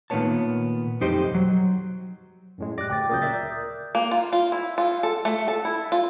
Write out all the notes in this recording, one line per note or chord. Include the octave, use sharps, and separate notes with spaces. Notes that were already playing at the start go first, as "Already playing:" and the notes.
A#2 D#3 A3 B3 C#5 A5
B1 F2 D#4 G4 C5 D#5
F#3
F#2 A2 G#3
G4 D5 D6 F#6 A#6
D2 G5 D6 A6
A#2 C#3 F#3 A#4 D#6 G6
D5 E5 A6
A#3
F4
F4
E4
F4
A4
A3
A4
E4
F4